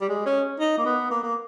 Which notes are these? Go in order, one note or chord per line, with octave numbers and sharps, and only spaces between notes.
G3
G#3
C#4
D#4
A#3
B3
A#3
A#3